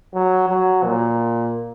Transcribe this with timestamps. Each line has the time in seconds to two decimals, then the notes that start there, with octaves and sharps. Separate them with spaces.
0.14 F#3
0.49 F#3
0.84 A#2